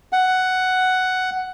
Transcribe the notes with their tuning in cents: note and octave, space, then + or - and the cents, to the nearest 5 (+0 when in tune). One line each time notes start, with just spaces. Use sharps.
F#5 +5